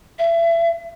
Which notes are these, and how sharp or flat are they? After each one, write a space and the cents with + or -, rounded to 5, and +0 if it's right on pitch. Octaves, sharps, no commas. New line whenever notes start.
E5 +30